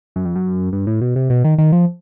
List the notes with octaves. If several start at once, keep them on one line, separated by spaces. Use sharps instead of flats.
F#2
F2
F#2
G2
A2
B2
C3
B2
D#3
D#3
F3